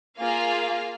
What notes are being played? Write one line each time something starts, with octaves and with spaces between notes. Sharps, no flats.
A#3 F4 G#4 F5